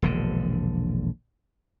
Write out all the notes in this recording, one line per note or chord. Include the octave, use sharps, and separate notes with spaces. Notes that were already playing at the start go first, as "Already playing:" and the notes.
E1 A#1 D3